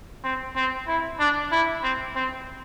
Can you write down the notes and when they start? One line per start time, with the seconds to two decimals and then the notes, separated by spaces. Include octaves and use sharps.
0.24 C4
0.56 C4
0.87 E4
1.20 D4
1.52 E4
1.83 C4
2.15 C4